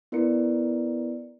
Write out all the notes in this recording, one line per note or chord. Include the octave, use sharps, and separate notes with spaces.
B3 E4 A#4 B4 D5 C#7